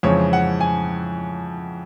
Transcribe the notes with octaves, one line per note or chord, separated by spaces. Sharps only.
F2 C#3 E3 G#3 C4 C#5
F#5
G#5